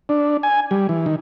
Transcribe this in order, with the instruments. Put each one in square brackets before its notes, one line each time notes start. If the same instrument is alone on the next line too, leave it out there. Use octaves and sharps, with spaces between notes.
[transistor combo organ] D4
G#5
G3
E3
D#3